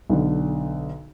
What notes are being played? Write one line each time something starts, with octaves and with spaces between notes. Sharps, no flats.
B1 D3